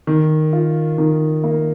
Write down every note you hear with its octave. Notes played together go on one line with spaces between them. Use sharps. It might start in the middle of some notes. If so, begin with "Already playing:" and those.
D#3
F4
D#3
A#3